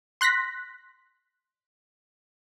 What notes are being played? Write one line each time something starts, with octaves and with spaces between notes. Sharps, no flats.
C6 F#6 A#6 B6